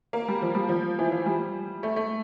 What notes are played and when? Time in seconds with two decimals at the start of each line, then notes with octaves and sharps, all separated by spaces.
0.13 A#3
0.28 G3
0.42 F3
0.55 G3
0.69 F3
0.99 E3
1.12 F3
1.26 G3
1.83 A3
1.96 A3